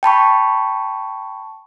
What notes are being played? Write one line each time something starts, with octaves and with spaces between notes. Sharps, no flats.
G5 A5 B5 C#6